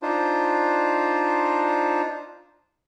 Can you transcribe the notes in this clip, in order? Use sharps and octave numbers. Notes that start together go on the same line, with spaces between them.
D4 D#4 F4 C5